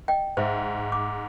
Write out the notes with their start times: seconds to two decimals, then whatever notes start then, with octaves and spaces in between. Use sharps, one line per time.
0.08 D#5 G5
0.37 G#2 C5 E5
0.92 D6